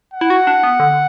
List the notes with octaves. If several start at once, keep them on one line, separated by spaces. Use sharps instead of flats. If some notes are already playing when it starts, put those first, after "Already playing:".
F#5
E4
F#4
D4
B3
D3